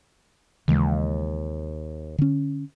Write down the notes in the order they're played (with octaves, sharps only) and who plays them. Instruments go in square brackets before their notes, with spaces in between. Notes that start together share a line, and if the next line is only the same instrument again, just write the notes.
[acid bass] D#2 [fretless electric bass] C#3 E3 G#3
[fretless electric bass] D3 C#4